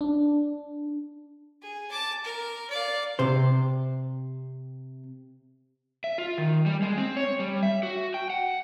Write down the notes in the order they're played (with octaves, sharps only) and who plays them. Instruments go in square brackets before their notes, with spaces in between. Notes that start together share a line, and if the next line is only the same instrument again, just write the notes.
[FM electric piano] D4
[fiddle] G#4
A5 D6
A#4
D5 F5
[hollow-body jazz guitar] C3 C5
[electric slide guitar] E5
F4
D#3
G3
G#3
C4
C#5
G3
E5
F#4
G5
F#5